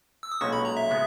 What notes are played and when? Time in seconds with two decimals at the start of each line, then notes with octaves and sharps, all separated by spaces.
0.23 E6
0.32 D#6
0.41 B1 A#2 G#3 C#4 F#4 C#6
0.53 B5
0.65 A#5
0.77 E5
0.89 C#3 G#3 B3